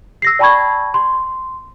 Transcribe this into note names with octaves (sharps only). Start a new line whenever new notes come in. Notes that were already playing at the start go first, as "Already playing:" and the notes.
E6 A#6 C7
D5 G5 A5 B5 C#6 G#6
C6